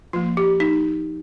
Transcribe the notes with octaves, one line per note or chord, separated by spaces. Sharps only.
F3 A#3 F4
G4
D#4